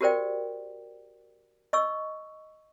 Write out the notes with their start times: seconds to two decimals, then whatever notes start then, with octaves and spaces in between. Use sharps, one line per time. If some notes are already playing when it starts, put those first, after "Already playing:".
0.01 F#4 G4 A#4 C5 D5 G5
1.73 D#5 C#6 E6